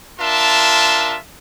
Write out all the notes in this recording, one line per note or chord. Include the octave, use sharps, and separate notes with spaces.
D4 F4 A#4 E5 A5 C6